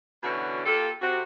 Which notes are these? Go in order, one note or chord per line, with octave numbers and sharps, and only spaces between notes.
B2 D3 E3 C#4 D4 F#4
A#3 F4 G4 A4
C3 F#4